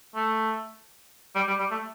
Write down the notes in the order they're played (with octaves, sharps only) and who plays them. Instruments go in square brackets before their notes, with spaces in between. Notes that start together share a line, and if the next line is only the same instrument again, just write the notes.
[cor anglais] A3
G3
G3
G3
A3